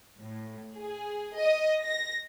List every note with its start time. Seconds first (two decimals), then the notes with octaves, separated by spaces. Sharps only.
0.22 A2
0.77 G#4
1.38 D#5
1.83 A#6